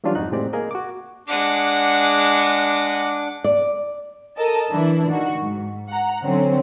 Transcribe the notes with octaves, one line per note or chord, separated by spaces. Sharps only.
E3 F#3 G3 C#4 D4 F4
F2 G#2 D#4 F#4 F#6
A2 G#3 C4 G4 D5
A#3 G#4 A#4 D#5
F#4 D6
G#3 D4 F#5 D6
D5
A4 A#4 D#5 A5
E3 D4 E4
D#3 F#4
G#2
F#5 A#5
D3 F#3 C4 C#4